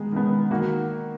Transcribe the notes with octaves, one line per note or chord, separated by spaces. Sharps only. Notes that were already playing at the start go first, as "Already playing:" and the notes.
Already playing: D#3 G#3 B3 G#4
D#3 G#3 B3
D#3 A#3 F#4